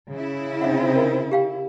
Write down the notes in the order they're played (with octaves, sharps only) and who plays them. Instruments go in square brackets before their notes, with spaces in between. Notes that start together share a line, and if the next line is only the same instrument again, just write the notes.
[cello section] C#3 E4
[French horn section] C4 [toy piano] D#4 E5 F#5
[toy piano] A#4
G4 F5 G5